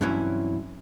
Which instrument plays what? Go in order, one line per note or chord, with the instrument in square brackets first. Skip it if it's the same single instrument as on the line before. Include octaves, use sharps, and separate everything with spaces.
[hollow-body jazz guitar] G2 C3 E3 F#3 C#4 E4